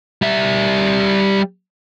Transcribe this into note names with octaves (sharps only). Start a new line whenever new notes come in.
G3 E5